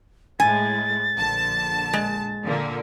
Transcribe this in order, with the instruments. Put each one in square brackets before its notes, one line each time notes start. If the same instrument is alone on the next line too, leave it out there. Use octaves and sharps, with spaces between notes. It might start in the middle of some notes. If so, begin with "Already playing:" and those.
[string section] A2 G#3 [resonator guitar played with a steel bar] G#5 [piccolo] A6
[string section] A#1 D3 A5
[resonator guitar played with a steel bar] G#3
[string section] A#2 D3 A#3